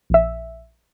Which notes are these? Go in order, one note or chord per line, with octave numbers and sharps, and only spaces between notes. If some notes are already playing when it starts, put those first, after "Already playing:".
A#1 E5